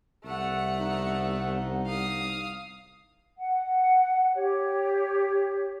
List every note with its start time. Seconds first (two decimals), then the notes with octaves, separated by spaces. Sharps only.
0.25 C2 A3 F#5
0.79 F3 B3 D#4
1.87 F5 D#6
3.38 F#5
4.33 G4 C#5